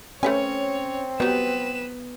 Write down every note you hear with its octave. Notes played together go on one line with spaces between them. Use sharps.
A3 C4 C#4 B4 C#5 G#5
F#3 G3 B3 B4 E7